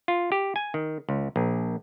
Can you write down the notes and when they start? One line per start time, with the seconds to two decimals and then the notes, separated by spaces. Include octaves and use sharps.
0.08 F4
0.32 G4
0.56 G#5
0.74 D#3
1.09 C#2
1.36 A#1